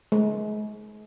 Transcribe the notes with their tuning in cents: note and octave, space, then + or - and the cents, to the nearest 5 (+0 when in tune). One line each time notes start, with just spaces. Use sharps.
G#3 +35